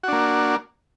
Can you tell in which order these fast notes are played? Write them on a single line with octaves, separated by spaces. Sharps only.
F#4 D4 A#3